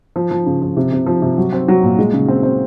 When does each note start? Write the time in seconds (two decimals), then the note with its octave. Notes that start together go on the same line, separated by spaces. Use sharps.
0.16 F3
0.31 F3
0.46 C#3
0.62 F3
0.77 C3
0.92 C3
1.06 F3
1.22 C3
1.38 F#3
1.53 C4
1.68 F#3
1.83 A#2
1.99 G#3
2.13 C#3
2.28 C4
2.43 C4